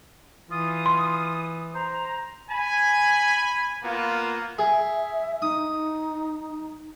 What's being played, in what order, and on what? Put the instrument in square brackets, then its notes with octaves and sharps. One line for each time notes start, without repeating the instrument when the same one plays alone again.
[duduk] E3 [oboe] F4 [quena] D#6
[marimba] C6
[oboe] C5 [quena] A#5
[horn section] G#5 B5
A#3 B3 F4
[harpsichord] G#4 [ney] E5
[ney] D#4 [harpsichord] D#6